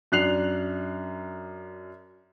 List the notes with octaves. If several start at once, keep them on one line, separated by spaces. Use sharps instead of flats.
F#2 D4 F#6 C7 F7 F#7